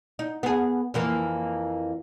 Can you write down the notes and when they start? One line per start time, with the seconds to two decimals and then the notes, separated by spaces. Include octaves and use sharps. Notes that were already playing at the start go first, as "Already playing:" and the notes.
0.19 D#4
0.43 B3 G#4
0.94 F2 E3 A#3